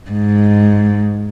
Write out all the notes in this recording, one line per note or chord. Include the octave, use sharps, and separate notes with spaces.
G#2